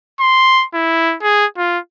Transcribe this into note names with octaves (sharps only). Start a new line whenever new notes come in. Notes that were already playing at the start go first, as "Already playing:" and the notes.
C6
E4
G#4
F4